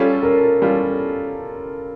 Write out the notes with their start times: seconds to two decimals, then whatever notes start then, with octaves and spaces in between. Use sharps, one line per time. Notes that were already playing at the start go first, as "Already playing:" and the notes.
Already playing: G3 C#4 F4 A4
0.23 A#4
0.62 G3 C#4 F4